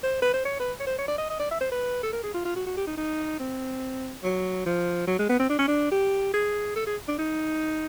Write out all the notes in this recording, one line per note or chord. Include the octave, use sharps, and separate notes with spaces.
C5
B4
C5
C#5
B4
C#5
C5
C#5
D5
D#5
D#5
D5
E5
C5
B4
A4
A#4
G#4
F4
F4
F#4
F#4
G4
D#4
D#4
C4
F#3
F3
F#3
G#3
B3
C4
D4
C#4
D4
G4
G#4
A4
G#4
D4
D#4